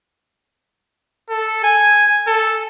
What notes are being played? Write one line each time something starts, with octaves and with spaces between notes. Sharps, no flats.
A4
G#5
A4